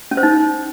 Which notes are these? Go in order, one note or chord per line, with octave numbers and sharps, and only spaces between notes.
C#4
C5
D#4